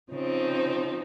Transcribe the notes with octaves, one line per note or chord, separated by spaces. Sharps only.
C#3 F3 C4 D#4